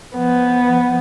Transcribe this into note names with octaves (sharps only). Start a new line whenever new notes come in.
F3 B3